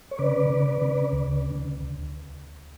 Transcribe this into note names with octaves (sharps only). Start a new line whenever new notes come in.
C#5
C#3 B4 D5
C#3
C#3
D2